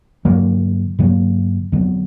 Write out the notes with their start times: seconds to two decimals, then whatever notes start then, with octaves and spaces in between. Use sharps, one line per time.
0.25 G2 D3 F#3 A#3
0.99 G2 D3 F#3 A#3
1.72 F2 D3 F#3 B3